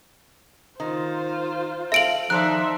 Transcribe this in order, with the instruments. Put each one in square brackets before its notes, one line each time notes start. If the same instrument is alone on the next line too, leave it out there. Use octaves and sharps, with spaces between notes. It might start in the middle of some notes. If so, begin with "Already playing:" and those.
[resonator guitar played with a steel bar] D#3 [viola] F4 C5
[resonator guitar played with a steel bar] A4 F5 [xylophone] E5 D7 F#7
[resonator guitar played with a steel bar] D#3 A4 D5 [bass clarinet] F3 [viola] D#4 E5 [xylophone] F#6